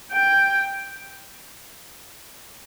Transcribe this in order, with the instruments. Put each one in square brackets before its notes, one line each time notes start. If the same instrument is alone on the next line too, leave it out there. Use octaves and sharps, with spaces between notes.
[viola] G5